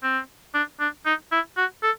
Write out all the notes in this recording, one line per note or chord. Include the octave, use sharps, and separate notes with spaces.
C4
D4
D4
D#4
E4
F#4
A4